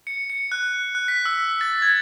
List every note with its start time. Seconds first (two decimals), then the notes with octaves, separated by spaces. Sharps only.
0.07 C#7
0.30 C#7
0.52 F#6
0.95 F#6
1.08 B6
1.26 E6
1.61 A6
1.82 G#6